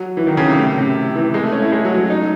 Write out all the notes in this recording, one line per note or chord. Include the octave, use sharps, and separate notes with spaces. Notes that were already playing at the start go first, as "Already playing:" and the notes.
Already playing: F#3
E3
D#3
C#3
C3
A2
C3
E3
G#3
A3
C#4
E4
G#3
F#3
F#3
D#4